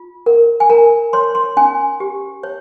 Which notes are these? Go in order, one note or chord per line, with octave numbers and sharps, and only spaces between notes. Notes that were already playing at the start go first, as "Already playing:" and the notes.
Already playing: F4
A#4
G#5
A#4 A#5
C#5 C6
C6
C#4 G#5
G4
C#5